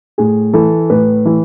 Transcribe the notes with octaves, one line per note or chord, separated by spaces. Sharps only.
A2 G#4
E3 A4
A2 B4
E3